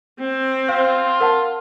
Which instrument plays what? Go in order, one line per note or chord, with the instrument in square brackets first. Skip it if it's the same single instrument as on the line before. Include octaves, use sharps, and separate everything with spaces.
[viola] C4
[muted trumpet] F4 [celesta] C5 F5
[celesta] A#4 F#5 A5